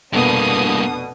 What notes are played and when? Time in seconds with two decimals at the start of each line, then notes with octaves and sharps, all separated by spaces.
0.13 F1 G2 B2 A#3 B3 D4 D#6